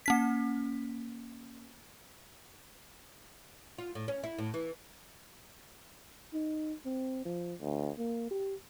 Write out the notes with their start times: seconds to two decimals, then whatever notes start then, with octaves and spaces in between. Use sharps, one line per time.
0.06 A#3 C#4 B6
3.78 F4
3.95 A2
4.08 C#4
4.24 E4
4.38 A2
4.54 E3
6.34 D#4
6.85 C4
7.26 F3
7.61 D2
7.98 A#3
8.31 G4